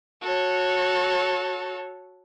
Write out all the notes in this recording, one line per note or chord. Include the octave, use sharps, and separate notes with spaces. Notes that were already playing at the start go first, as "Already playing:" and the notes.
F#4 A4 C#5